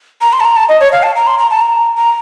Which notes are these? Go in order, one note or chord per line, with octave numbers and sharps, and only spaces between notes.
A#5
C6
A5
A#5
A5
D#5
C#5
F5
A5
A#5
C6
A#5
A5
A#5
A#5